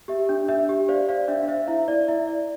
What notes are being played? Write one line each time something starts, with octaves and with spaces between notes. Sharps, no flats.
G4 E5
D4
D4 E5
G4
C5 D5 F5
C5 D5 F5
D4 E5
F5
C5 E5
E4 E5
E4 D5
E4 E5
D5